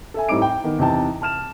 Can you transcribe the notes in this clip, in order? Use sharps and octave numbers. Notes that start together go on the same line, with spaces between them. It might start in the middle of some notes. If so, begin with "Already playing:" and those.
A4 E5 G#5
A2 G3 C4 D#4 D6 D7
G5
D#3 B3
E2 C3 D#4 G5 A5
A5 F6 E7